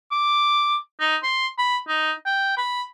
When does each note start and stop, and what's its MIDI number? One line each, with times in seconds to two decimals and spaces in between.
0.12 0.77 86
1.00 1.17 63
1.23 1.47 84
1.58 1.78 83
1.88 2.12 63
2.26 2.55 79
2.57 2.83 83